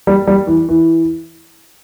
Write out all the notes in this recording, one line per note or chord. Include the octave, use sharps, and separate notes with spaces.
G3
G3
E3
E3